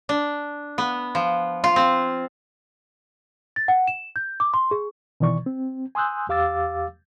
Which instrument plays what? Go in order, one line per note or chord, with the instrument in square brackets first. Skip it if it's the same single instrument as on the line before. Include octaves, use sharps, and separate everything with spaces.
[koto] D4
B3
F3
F4
C4
[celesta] A6
F#5
E7
G6
D6
C6
G#4
[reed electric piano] B2 D#3 E3 D5 C#6
C4
G#5 C6 D#6 E6 F#6 G6
E2 G4 F5 D6 E6 A6